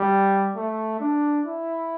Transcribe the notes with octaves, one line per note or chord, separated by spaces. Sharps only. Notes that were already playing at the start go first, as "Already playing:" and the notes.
Already playing: G3
A3
D4
E4